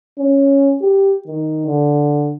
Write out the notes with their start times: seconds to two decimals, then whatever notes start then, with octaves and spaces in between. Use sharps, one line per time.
0.19 C#4
0.81 G4
1.28 D#3
1.66 D3